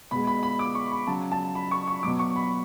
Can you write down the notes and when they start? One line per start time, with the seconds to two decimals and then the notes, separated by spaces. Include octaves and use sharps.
0.11 B2 G#3 B5
0.27 B5
0.43 B5
0.59 D6
0.75 C#6
0.91 B5
1.07 C#3 F#3 A5
1.32 A5
1.55 B5
1.71 C#6
1.87 C#6
2.03 B2 F#3 D6
2.19 C#6
2.36 B5